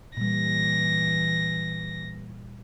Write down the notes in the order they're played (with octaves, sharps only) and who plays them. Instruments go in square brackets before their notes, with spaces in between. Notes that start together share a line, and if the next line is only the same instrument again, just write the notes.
[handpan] A#2 G3 [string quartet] E3 A#6